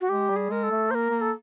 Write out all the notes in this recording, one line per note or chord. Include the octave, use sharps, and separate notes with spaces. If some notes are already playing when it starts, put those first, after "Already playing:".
F#4
G#3 G4
G3
G#4
G#3 A#4
A4
A3
A#3 A#4 C5
A#3
A4